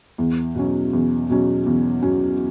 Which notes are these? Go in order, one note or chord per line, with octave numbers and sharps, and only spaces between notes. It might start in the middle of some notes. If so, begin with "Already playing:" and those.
E2
B2 F#3 C#4
E2
B2 F#3 C#4
E2
B2 F#3 C#4